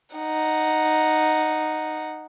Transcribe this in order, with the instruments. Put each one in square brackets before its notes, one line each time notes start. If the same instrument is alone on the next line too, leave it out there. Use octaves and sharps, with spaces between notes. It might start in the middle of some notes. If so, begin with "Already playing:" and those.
[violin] D#4 F#5